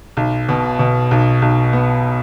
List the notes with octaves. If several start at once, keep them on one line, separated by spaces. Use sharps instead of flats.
B1
B2
B2
B1
B1
B3